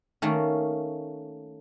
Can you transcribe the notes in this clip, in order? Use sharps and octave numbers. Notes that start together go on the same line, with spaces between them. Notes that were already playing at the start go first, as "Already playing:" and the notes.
D#3 A3 A#3 C#4